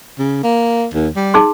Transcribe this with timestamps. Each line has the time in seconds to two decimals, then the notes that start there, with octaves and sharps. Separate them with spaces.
0.19 C#3
0.44 A#3
0.94 D#2
1.16 G3
1.34 D#4 G#4 C6